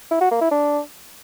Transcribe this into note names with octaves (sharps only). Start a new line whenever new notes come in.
E4
F#4
A#3
E4
D4